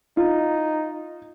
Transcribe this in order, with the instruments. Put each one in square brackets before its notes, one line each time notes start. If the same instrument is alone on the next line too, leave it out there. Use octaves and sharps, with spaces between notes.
[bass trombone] D#4 [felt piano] F4